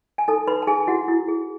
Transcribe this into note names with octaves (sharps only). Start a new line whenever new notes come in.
G#5
D#4 A4 A5
D#4 B4 B5
A5
D#4 G#4 G#5
E4 F#4 F#5
E4
G#4